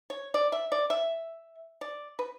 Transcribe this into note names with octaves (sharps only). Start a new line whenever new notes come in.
C#5
D5
E5
D5
E5
D5
B4